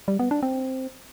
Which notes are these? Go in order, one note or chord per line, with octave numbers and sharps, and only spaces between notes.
G3
B3
D4
C4